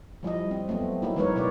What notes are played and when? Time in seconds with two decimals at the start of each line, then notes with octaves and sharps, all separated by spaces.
0.23 F3 G3 E4 D#5
0.51 C4
0.68 F#3 A3 B3 C4
1.02 F#3 A#3 D#4 E4
1.16 E3 G#3 D#4 A#4 B4 C#5
1.36 B2 D#4 C#5 D5